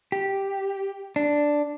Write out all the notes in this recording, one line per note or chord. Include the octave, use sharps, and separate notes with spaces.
G4
D4